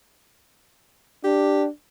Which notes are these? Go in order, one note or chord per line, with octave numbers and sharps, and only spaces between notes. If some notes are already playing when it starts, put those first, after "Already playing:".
D4 G4